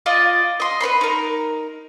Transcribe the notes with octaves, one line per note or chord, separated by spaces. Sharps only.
F4 D5 D#5
D#5 C6
B4 C#5 B5 C6
D#4 A#4